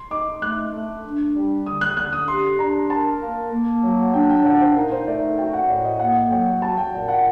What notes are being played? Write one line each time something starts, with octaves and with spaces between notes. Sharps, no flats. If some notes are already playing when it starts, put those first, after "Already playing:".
Already playing: C6
D#4 D6
A3 F#6
A3
D4
G3
D3 D#6
F#6
D3 F#6
D#6
G4 C6
D4 A#5
A#4 A5
A#3
A#3
F#3
D4 G5
G5
A#2 F#5
C5
D#4 A#4
C5
A3 D5
F#4 G5
F#5
A2 D5
D#5
A#3 F#5
F#3 G5
F#4 A5
G5
A#2
F#5